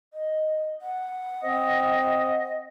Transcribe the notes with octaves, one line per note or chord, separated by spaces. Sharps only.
D#5
F#5
C4 D#5